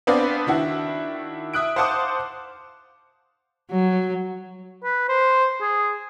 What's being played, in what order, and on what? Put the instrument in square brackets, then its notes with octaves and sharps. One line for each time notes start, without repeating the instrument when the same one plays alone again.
[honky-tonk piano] B3 C4 D4 B4 D5 F5
D#3 D4 E4 F#4
E5 D#6 F#6 D7
C5 F5 F#5 A5 D6 D#6
[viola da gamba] F#3
[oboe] B4
C5
G#4